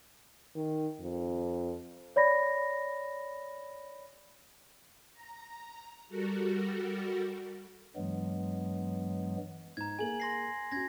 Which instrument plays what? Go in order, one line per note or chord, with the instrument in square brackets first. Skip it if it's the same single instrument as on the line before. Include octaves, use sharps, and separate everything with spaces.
[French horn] D#3
F2
[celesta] C#5 D5 B5 A#6
[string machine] A#5
G3 F#4 A4 A#4
[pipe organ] G2 E3 F#3 G#3 B3
[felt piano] G#2 [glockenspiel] A#5 G#6
[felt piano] A#3 G#4 [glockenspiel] G#5 F#7
[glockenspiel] C6 A#6 C7
[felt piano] C#4 F#4 [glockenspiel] G#6 A#6